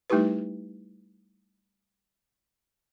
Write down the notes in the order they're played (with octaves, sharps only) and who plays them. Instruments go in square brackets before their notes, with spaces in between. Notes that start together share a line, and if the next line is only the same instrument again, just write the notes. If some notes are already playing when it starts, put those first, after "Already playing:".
[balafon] G3 A3 D#4 E4 G4 B4